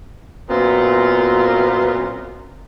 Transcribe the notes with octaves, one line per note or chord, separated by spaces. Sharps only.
F#2 A#2 B3 C4 F4